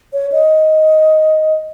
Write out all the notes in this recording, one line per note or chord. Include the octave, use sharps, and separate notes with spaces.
C#5
D#5